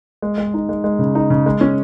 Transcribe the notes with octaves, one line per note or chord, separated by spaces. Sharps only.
G#3
G#3
D#4
G#3
G#3
C#3
D#4
C#3
G#3
C#4